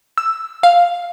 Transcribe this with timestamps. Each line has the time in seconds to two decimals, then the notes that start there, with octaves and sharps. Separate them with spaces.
0.18 E6
0.63 F5